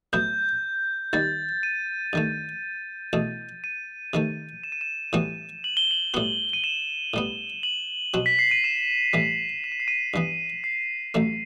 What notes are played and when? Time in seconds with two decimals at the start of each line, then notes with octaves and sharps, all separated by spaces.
0.13 A2 F#3 B3 E4 G6
1.13 D#2 D#3 G3 A6
1.63 D#7
2.13 G2 D#3 A3
3.13 E2 B2 A3
3.64 D#7
4.14 C3 D#3 A3
4.64 E7
4.72 D#7
4.81 E7
5.13 A2 E3 G3 B3 F#4
5.64 F#7
5.77 G7
5.91 F#7
6.14 A2 G3 B3 F#4
6.53 D#7
6.64 E7
7.14 A2 G3 B3
7.63 F#7
8.14 B2 F#3 C4 F#4
8.26 B6
8.39 C7
8.51 D#7
8.64 E7
9.13 A2 E3 G3
9.64 E7
9.72 D#7
9.80 C7
9.88 D#7
10.14 G2 E3 B3
10.64 C7
11.14 A1 A2 F#3 A3